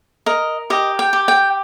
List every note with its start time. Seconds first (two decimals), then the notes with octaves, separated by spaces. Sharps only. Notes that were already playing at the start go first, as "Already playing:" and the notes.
0.26 A#4 D#5
0.70 G4 D#5
0.99 G5
1.13 G4
1.28 G5